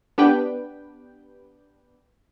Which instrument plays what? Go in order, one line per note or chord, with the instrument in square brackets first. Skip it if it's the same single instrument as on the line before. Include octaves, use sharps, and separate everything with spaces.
[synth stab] B3 D4 G4 B4 G5